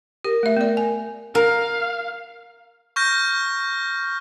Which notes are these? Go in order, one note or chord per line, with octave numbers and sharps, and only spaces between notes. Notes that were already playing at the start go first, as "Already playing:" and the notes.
G4 A#4
A3 E5
B3 D5
G#5
A#4 F5
C#6 F6 G6 A#6